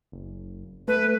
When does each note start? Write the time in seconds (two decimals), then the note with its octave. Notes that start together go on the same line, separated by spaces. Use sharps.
0.12 F#1
0.88 A3 B4